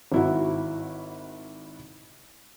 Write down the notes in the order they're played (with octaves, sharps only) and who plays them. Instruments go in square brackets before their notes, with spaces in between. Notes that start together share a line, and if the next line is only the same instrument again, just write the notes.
[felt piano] G#1 E4 F#4